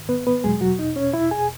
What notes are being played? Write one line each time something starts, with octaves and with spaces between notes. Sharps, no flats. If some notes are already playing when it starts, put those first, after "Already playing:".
Already playing: G#2 D#3
B3 B4
B3 B4
E2 B2 F#3 G#3 G#4
F#3 F#4
D#4
C#4 C#5
E4 E5
G#4 G#5